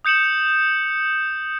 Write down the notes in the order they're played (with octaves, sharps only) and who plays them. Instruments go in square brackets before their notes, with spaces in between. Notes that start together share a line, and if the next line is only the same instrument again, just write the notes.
[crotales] D#6 G6 C#7 E7 F#7